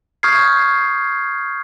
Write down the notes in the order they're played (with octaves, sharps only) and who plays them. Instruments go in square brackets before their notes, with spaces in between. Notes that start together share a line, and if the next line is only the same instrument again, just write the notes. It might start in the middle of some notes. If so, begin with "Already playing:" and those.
[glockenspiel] C#6 D#6 F6 G6 G#6 C7